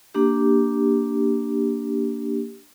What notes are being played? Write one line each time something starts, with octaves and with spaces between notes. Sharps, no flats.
A#3 D4 G4